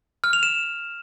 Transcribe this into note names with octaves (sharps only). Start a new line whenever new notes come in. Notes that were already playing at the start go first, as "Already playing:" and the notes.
F6
F7
E7